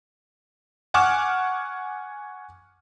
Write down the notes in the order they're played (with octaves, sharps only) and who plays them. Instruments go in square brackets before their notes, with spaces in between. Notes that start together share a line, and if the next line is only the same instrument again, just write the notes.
[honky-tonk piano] F#5 G#5 C#6 D6 F6 E7